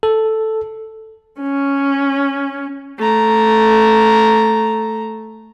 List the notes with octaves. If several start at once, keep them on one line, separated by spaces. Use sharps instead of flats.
A4
C#4
A3 A#5